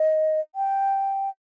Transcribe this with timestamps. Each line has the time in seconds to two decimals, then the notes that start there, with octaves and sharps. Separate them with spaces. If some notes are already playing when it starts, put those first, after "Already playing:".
Already playing: D#5
0.55 G5